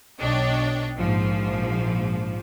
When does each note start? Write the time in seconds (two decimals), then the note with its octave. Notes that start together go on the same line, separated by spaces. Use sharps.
0.19 B1 D4 C#5 D#5 G5
0.98 A#1 G#2 F3